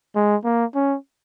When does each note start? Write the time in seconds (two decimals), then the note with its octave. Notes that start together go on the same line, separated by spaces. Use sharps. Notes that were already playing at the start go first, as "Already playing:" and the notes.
0.15 G#3
0.44 A#3
0.75 C#4